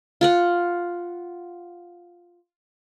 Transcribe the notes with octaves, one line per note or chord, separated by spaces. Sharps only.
F4 F5 F#5